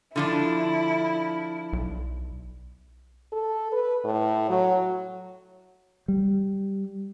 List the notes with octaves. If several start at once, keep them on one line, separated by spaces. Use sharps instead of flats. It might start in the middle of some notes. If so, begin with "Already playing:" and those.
D3 F3 D4 E4
B1
A4
B4
A2
F#3
G3